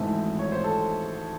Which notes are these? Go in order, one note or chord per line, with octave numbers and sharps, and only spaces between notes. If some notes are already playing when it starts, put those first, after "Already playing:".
Already playing: G#1 G#2 E3 A3 C4 E5
C#5
C5
A4